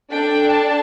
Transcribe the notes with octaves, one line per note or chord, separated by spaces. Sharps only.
D4 A4 G5
A5